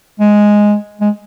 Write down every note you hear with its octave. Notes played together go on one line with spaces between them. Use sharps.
G#3
G#3